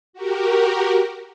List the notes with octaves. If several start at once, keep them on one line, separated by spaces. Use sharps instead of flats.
F#4 G4 A#4